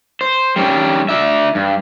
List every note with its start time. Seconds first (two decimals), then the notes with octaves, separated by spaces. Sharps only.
0.21 C5
0.56 G3 C#4 D4
1.09 D4 E5
1.55 G2